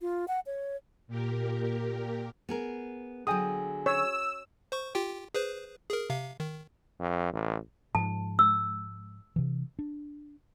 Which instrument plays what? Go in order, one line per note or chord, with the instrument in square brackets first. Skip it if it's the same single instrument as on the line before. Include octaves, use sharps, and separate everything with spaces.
[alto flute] F4
F#5
C#5
[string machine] A#2 G4 A#4
[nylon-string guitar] B3 G#4 A#4
[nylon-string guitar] D3 F#3 [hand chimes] G#4 G#5 [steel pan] G5 D#6
[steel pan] C#5 [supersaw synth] E6
[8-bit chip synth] C5 C#6
F4 G4 G5
G#4 B4 C5
G#4 A#4
C3 F5
D#3
[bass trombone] F2
A1
[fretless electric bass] G#2 F3 [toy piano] A5
[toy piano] E6
[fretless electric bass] C3 E3
D4